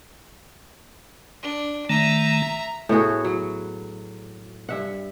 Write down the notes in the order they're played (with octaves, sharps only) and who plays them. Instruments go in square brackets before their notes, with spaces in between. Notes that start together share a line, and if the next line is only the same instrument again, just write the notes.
[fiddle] D4
[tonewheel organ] D#3 A3 [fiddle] E5 A#5
[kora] A2 B3 F#4 G#4
F#3
G2 E5 F#5